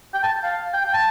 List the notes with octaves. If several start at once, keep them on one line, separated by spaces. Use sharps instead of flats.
G5
A5
F5
G5
G5
A5